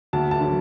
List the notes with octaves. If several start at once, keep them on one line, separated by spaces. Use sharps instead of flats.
D2 A5
A5
D3 F#3